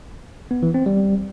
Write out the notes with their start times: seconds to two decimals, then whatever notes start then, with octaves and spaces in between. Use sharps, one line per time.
0.51 B3
0.63 E3
0.74 C4
0.86 G3